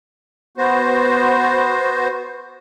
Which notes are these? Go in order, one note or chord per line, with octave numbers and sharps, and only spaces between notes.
B3 F#4 C5